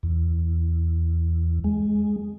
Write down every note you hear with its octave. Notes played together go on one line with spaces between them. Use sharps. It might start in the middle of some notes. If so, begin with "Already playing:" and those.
E2
G#3